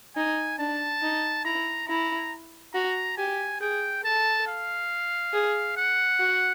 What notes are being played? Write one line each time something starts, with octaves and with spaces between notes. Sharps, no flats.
D#4 G#5
D4 A5
D#4
E4 A#5
E4 A#5
F#4 A#5
G4 G#5
G#4 G5
A4 A5
F5
G#4
F#5
F#4